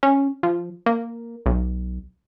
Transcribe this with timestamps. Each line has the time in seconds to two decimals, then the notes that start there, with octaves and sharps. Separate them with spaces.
0.03 C#4
0.43 F3
0.86 A#3
1.46 B1